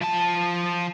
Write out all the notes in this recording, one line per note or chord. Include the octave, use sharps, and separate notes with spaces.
F3 A5